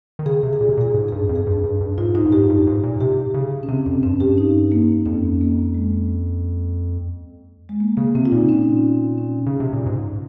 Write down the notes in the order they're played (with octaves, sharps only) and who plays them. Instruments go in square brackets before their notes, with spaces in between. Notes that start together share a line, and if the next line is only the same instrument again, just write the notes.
[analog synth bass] D#3
[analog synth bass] C#3 [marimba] G#4
[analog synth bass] C3
[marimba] G#4
[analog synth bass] A#2
C3
[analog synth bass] A#2 [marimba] G#4
[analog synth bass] G#2
[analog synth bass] G2 [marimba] G#4
[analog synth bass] F2
[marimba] G#4
[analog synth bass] G2
G2
G2
[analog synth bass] G#2 [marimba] F4
[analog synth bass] G#2 [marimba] D#4
[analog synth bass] G2
[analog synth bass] G#2 [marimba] G4
[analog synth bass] G2
G#2
A#2
[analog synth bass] C3 [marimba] G4
[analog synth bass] C#3
[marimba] C#4
[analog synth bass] C3 [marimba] C4
[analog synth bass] F2 [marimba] C4
[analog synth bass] G2 [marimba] C#4
[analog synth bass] G2 [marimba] G4
[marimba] D#4
A#3
[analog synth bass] F2 [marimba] C#4
[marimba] A#3
G#3
G#3
A#3
[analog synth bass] C#3 [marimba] A#3
[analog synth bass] C3 [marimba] C4
[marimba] F4
[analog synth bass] A#2 [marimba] D#4
[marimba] C#4
C#4
[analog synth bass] C#3
C3
A#2
G#2